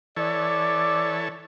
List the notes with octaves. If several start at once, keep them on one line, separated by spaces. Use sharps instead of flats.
E3 A4 C#5 D5